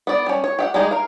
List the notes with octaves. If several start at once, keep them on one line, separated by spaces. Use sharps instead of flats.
B3 D5
G3 C#4
C#5
G4 E5 F#5
G3 G#3 A#3 D#4 G#4
A#4 F5